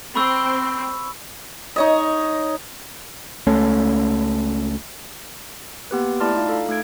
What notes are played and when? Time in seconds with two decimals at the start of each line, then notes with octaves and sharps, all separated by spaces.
0.15 C4 B5 C#6 E6
1.76 D#4 C#5 D#5
3.47 C#2 A3 C#4
5.91 A#3 B3 G4 B4
6.20 A3 E4 D5 A5 C6 F6
6.34 D#4 F4 F5
6.49 A4 F5
6.69 A3 D#4 A4 G#6 D7